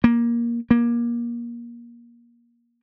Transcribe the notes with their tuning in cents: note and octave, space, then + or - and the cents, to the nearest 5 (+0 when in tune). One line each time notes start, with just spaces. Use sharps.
A#3 +15
A#3 +25